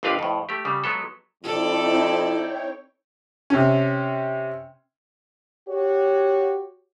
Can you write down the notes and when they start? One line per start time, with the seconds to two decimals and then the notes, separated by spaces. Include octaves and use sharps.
0.03 G1 D#2 C4 D4 B4 F5
0.19 F2 A2
0.49 A3 G4
0.65 C#3 G3
0.84 F#3 G#3 B3 A4
1.43 F2 C4 D#4 E4 A4 D5
2.27 C#5 G5
3.50 C3 C#4
5.69 F#4 G4 C#5